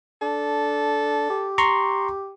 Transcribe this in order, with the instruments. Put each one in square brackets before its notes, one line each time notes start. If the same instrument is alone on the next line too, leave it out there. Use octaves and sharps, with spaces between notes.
[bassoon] D4 [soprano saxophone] A4
[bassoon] G4
[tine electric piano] A#5 C6 C#6